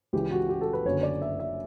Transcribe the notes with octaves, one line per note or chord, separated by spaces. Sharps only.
C#2 C#3 E3 G4
F#4
G4
A4
B4
F#1 F#2 D3 C#5
D5
E5
E5